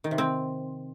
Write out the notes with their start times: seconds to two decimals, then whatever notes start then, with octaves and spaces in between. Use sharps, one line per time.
0.04 D#3
0.11 C3
0.18 C4